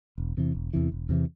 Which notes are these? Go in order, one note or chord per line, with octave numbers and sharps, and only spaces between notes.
E1
E2 C3 E3
E1
E2 C3 E3
E1
E2 C3 E3